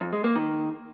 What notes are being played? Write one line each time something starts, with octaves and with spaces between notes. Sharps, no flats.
F2
G#3
A#3
D#3